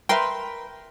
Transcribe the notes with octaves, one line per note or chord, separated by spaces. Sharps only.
A#4 B4 E5 G5 C6